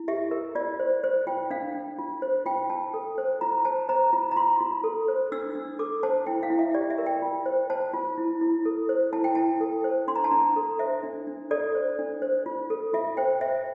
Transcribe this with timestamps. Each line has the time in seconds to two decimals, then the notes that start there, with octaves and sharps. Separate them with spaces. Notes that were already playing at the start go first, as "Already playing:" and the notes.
Already playing: E4
0.08 G4 E5
0.31 A#4
0.55 F4 D5
0.80 C5
1.04 C5
1.27 F4 G5
1.50 D4 F5
1.74 D4
1.98 F4
2.22 C5
2.45 F4 G5
2.70 F4 A5
2.94 A4
3.18 C5
3.41 F4 A#5
3.65 C5 A5
3.89 C5 A#5
4.13 F4
4.31 A#5
4.36 F4 C6
4.61 F4
4.84 A4
5.08 C5
5.32 D4 E6
5.55 D4
5.79 A4 D6
6.03 C5 A5
6.26 E4 G5
6.43 F5
6.50 E4
6.59 E5
6.74 G4 D5
6.90 E5
6.98 A#4
7.06 G5
7.22 F4
7.46 C5
7.70 C5 A5
7.94 F4
8.18 E4
8.41 E4
8.65 A4
8.89 C5
9.13 E4 A5
9.24 G5
9.35 E4 A5
9.60 A4
9.84 C5
10.08 D4 C6
10.16 A#5
10.24 A5
10.31 D4 A#5
10.56 A4
10.79 C5 E5
11.03 D4
11.27 D4
11.51 A4 D5
11.75 C5
11.99 D4
12.22 C5
12.46 F4
12.70 A4
12.93 F4 E5
13.17 C5 G5
13.41 C5 E5